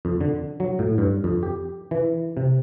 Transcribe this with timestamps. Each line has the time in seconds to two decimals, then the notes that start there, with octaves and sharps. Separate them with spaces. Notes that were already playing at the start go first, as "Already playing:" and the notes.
0.05 F2
0.21 D3
0.60 F#3
0.79 A2
0.98 G2
1.24 F2
1.43 G4
1.91 E3
2.37 C3